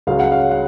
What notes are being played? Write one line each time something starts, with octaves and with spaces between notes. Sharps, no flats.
C#2 C#3 F#3 C#4 F5
F#5
F5
F#5